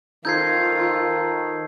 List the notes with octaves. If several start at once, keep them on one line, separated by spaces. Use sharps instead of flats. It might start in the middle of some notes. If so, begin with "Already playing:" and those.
D#3 D#4 F4 A4 C5 G6 G#6 C7